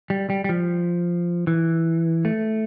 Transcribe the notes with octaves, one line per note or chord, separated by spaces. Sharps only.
G3
G3
G3
F3
E3
A3